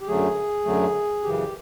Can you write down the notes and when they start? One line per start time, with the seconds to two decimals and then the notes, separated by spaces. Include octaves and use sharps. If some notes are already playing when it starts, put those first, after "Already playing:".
0.01 G4
0.08 F#2 D3 F#3 A3 G#4
0.65 F#2 D3 F#3 A3
1.23 F#2 C#3 E3 G4